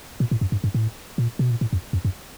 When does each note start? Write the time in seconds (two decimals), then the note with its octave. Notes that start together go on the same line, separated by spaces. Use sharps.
0.20 A#2
0.31 A2
0.41 F#2
0.52 G2
0.64 G2
0.74 A2
1.18 A#2
1.39 B2
1.51 A#2
1.61 A2
1.73 F2
1.93 F2
2.05 F#2